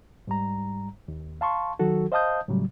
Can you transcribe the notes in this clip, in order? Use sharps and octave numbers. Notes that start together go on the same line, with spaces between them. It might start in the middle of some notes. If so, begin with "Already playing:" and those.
G#2 G3 A#5
D#2
F5 A5 C6 C#6
D#3 F#3 F#4 A4
C5 D#5 F5 A5 D#6 G6
A2 C#3 F#3 G3